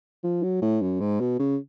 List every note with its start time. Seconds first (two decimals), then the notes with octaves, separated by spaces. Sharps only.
0.24 F3
0.43 F#3
0.62 A2
0.82 F#2
1.00 G#2
1.20 B2
1.39 C#3